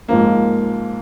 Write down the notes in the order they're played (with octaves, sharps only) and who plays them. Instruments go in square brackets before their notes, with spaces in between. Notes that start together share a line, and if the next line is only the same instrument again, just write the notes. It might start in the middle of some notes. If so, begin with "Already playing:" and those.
[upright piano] G#2 F3 A#3